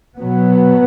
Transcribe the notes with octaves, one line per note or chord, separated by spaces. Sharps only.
B2 F#3 B3